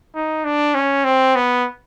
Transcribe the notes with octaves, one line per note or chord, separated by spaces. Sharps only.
D#4
D4
C#4
C4
B3